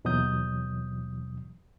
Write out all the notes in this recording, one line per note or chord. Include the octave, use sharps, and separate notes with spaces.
D#2 B2 E3 F#3 D#6 G6